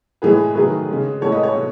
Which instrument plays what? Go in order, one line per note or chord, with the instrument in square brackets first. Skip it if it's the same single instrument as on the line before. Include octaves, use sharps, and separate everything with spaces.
[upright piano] A2 E3 G#3 G#4 B4
D#3 F#3 A3 G#4 B4
C#3 G#3
A2 E3 G#3 A4 C#5
B4 D#5
A4 C#5
B2